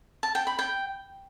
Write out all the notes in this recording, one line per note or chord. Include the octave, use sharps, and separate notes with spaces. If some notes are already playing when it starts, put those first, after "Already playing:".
A5
G5
B5
G5